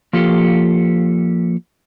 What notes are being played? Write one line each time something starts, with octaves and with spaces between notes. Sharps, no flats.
F3 A#3 F4 G4 A4